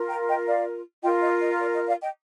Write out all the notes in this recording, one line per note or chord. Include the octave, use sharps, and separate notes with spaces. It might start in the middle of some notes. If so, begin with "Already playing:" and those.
Already playing: F4 A#4
G5 A#5
D#5 G5
D5 F5
F4 A#4 D#5 G5
D#5
D#5
D5
D#5
D5 F5
D#5 G5